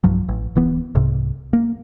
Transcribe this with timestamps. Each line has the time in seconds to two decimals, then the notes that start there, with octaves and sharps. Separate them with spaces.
0.04 B1 G2 F3 F#3
0.28 A1
0.56 D1 E3 B3
0.95 C2 G#2 C3
1.53 A#3